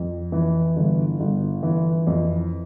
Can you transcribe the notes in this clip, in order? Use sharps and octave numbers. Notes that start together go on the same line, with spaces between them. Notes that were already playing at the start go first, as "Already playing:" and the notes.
Already playing: F2
E3
G1
G1
E3
F2